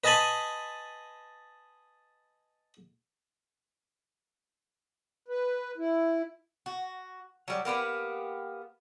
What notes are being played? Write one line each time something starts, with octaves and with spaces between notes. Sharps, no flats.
B4 D#5 G#5 A5 B5 C6
B4
E4
F#4
F#3 G3
A#3 B3 G4 B4